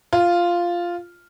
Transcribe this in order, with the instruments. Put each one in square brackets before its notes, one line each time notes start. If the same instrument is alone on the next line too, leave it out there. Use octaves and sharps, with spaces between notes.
[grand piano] F4